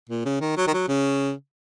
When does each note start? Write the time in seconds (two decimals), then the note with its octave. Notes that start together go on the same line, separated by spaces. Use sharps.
0.09 A#2
0.25 C#3
0.41 D#3
0.57 F#3
0.67 D#3
0.74 F#3
0.88 C#3